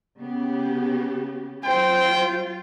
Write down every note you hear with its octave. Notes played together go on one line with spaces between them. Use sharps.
C#3 B3 G4
F#3 F4 C5 G5